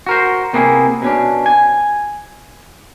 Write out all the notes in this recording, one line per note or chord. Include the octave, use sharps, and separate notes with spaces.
F#4 A#4 C5
C3 A#3 B3 E4 G#4
B2 C#4 D4
G#5